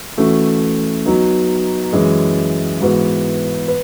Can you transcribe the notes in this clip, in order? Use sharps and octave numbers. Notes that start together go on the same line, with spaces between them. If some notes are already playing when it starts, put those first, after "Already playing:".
E3 A3 C#4 F#4
F#3 B3 D#4
F#2 E3 G#3
G#2 E3 B3 F#4 B4
B4